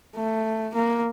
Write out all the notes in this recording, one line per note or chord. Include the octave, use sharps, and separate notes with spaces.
A3
A#3